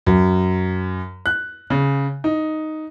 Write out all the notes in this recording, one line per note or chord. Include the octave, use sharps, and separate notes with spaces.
F#2
F#6
C#3
D#4